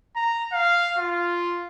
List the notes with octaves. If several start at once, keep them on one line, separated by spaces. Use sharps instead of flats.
A#5
F5
F4